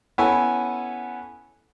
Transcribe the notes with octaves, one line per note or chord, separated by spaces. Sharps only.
B3 C#4 E4 A4 G#5